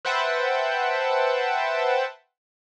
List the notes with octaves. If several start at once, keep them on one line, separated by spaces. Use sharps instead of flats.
B4 C5 E5 F#5 G5 A5